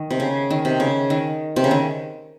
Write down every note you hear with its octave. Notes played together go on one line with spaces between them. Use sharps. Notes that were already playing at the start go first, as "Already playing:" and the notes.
Already playing: D#3
C3
C#3
D#3
C3
C#3
D#3
C3
C#3
D#3